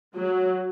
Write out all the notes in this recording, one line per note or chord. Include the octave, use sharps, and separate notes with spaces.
F#3